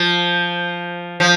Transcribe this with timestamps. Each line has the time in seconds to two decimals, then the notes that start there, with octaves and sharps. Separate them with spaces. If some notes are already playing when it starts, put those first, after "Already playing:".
Already playing: F3
1.20 F3